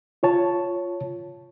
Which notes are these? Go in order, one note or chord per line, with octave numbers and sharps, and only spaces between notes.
F4 C#5 A5